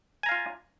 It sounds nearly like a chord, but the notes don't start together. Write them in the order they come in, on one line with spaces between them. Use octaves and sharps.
G#5 A#5 F5 F4